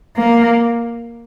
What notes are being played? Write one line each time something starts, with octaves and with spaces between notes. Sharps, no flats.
A#3